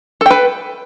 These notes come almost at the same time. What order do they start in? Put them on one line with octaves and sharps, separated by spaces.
A4 G5 B4